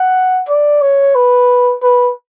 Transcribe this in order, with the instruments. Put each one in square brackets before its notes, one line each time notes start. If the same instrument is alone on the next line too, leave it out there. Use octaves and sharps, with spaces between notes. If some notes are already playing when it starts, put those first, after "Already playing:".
Already playing: [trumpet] F#5
D5
C#5
B4
B4